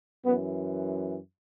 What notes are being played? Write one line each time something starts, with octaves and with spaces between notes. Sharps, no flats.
F#2 E3 B3